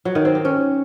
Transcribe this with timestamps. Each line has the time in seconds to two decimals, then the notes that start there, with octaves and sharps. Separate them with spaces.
0.05 F#3
0.15 D#3
0.25 C4
0.35 G4
0.45 C#4